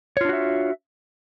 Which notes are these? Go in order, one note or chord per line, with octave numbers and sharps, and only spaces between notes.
D4 F4 F#4 C#5 E5